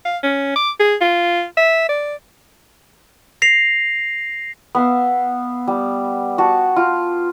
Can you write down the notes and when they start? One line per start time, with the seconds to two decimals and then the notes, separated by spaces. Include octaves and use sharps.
0.05 F5
0.23 C#4
0.56 D6
0.80 G#4
1.01 F4
1.57 E5
1.89 D5
3.42 A#6 C7 F7
4.75 B3 E5 F5
5.68 G3
6.38 F#4 A5
6.76 F4